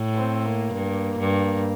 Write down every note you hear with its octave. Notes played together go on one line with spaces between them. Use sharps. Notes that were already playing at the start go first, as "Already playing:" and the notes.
Already playing: A2
C4
A#3
G2
G2